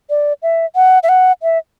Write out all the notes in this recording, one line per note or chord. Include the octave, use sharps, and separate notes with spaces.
D5
E5
F#5
E5
F#5
E5